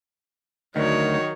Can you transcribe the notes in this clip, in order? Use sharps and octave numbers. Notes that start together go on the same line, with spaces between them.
D2 D#3 F#3 C#5